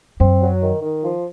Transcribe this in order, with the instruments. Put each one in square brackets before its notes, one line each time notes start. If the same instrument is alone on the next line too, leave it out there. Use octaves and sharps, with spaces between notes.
[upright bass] F#2 [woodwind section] C4
[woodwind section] F#3
D#3
D#3
F3